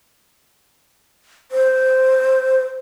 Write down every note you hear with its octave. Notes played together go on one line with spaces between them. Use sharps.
C5